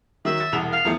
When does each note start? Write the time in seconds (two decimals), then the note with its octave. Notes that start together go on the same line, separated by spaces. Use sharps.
0.25 D#3 F#3 E5
0.40 A6
0.52 E1 C2 F7
0.72 F5
0.85 E2 F3 A3